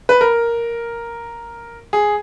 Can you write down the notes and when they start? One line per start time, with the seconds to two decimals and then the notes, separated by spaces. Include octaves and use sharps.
0.09 B4
0.21 A#4
1.93 G#4